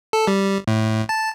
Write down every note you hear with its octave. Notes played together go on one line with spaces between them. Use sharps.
A4
G3
A2
A5